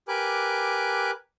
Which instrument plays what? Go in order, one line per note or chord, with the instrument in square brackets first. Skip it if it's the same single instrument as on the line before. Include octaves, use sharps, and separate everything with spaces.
[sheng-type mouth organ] G4 A#4 B4 G#5 D6 F#6